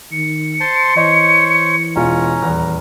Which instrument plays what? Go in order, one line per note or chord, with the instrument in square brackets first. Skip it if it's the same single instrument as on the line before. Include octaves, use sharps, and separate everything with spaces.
[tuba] D#3 [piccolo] C#7
[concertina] C5 A5 C6
[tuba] E3 [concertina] C5 C#5 [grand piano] D#5
[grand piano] E1 F4 [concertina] C#4 [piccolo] A#5
[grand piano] D#1 E2